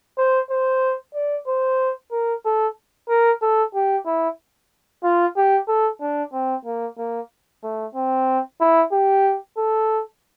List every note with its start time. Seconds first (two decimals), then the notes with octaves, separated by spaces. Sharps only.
0.18 C5
0.51 C5
1.15 D5
1.47 C5
2.12 A#4
2.45 A4
3.09 A#4
3.42 A4
3.75 G4
4.06 E4
5.04 F4
5.37 G4
5.68 A4
6.01 D4
6.33 C4
6.65 A#3
6.98 A#3
7.64 A3
7.95 C4
8.61 E4
8.92 G4
9.58 A4